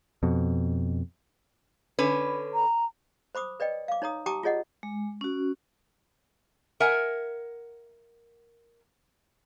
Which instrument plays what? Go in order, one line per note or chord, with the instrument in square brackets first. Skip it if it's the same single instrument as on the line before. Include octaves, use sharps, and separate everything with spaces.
[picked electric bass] F2 B2
[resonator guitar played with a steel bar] D3 C#4 B4
[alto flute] A#5
[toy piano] C5 B5 D6 D#6
B4 D5 D#5 G5
F5 D6
D#4 C#5 A#5 D#6
G4 G5 A5 A#5 D6 D#6
F4 G#4 C#5 D#5 F#5
[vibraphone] G#3
C#4 F#4
[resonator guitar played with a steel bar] A#4 E5 F#5 G#5